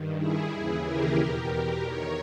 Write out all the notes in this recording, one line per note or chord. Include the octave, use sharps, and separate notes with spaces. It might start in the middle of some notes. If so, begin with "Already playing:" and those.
Already playing: G2 D#3
E4 G#4
D#2 C#3 E3
G4 A#4
E2 B2
E2 D#3 A#4 C#5